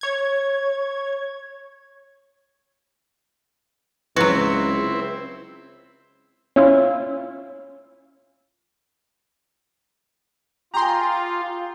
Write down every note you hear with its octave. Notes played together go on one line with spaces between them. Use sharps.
C#5 G#6
C#2 F#3 C4 E4 F#4 B4
C#4 E4 F4
F4 G4 G#4 G#5 A#5 C6